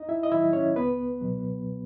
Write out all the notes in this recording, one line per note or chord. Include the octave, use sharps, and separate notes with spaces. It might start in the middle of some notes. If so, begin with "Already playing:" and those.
Already playing: E2 D#4 D#5
E4 E5
D#5
D#3 F#3 E4 E5
C#4 C#5
C#2 B3 B4
B2 F#3